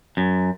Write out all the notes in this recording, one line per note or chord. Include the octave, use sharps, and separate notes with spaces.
F#2